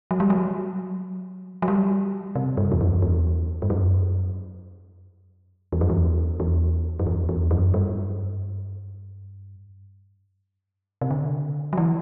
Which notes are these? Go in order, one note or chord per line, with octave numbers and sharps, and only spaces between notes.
F#3
G3
F#3
F#3
G3
C3
G2
E2
F#2
E2
G2
F#2
E2
F#2
E2
E2
F#2
E2
E2
F#2
G2
C3
D3
F#3
E3